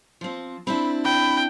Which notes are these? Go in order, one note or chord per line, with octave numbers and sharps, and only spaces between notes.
F3 C4
C4 D4 E4 B5
G5 B5